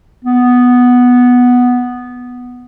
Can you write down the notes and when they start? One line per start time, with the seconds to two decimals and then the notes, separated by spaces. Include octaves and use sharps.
0.24 B3